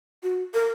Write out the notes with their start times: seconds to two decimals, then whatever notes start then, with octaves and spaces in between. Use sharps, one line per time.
0.23 F#4
0.54 A#4